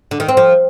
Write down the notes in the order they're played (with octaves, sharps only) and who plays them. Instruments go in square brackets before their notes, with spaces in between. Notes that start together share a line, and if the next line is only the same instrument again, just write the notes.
[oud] D3
D#3
C4
F3